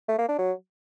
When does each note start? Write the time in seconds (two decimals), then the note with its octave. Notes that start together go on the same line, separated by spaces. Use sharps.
0.08 A3
0.18 A#3
0.29 D4
0.39 F#3